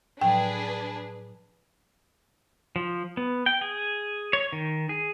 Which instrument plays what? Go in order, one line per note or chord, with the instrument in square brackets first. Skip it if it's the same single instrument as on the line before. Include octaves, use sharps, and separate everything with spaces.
[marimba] A2 F3 F#3 [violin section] D4 G#4 B4 [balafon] G5
[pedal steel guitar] F3
B3
G5
G#4
C#5
D#3
G#4